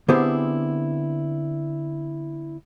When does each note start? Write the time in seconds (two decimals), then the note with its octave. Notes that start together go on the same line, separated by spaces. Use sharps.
0.08 D3 B3 C4 E4 G4 G#4